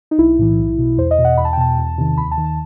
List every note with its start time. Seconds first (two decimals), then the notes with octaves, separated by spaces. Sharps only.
0.11 D#4
0.18 B1 E4
0.39 A2 E3
0.58 B1
0.78 B2
0.98 E2 C5
1.11 D#5
1.19 B2
1.25 F#5
1.37 E2 B5
1.45 A5
1.53 G5
1.58 B2 A5
1.78 E2
1.98 C3 D#3
2.18 D#2 B5
2.31 A5
2.38 D#3
2.44 A5